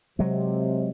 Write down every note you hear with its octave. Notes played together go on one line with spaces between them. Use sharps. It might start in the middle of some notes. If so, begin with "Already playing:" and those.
C3 F#3 G#3